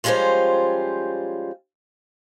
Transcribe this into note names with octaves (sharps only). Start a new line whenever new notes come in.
F3 G3 G#3 C#4 F4 C5